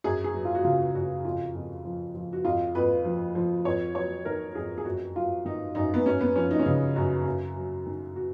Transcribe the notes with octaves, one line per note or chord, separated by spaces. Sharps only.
F#2 G#4
G#4
F#3
F4
F#4
C#3 F4
F#2 F#4
F2 F4
F2
F3
F3
F#4
F2 F4
F2 B4
F3
F3
F2 C#5
F#3 C#5
D#3 A#4
F2 G#4
G#4
F#2 F#4
F#3 F4
D#3 D#4
F#2 D#4
B3
F#2 C#4
B3
F3 C#4
D#4
C#4
C#3 D#4
F#2 F#4
F#2
F#3
D#3
F#4